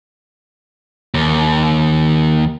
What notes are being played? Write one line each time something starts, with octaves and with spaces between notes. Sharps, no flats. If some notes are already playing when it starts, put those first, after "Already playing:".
D#2